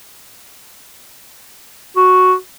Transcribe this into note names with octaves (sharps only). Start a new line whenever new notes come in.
F#4